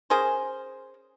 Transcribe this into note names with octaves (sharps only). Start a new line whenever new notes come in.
C#4 G#4 A#4 C5